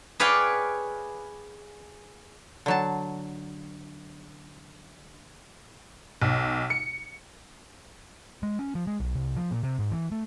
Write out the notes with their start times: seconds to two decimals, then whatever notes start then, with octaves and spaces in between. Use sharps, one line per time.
0.20 G#4 B4 C#5 D5 F5 G5
2.66 D3 F#3 A5
6.22 B1
6.70 C#7
8.43 G#3
8.59 C#4
8.75 F3
8.87 G#3
9.00 B1
9.15 C2
9.36 F3
9.51 A#2
9.64 C3
9.79 G#2
9.92 E3
10.12 A3